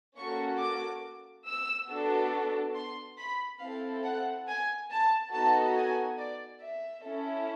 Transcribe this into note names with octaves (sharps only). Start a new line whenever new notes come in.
A#3 C#4 F#4 A4 C#6
D6
E6
B3 D4 F#4 A4
C6
B5
C4 E4 A4 F5
F#5
G#5
A5
B3 D#4 F#4 A4 A5
G#5
D5
E5
C#4 E4 A4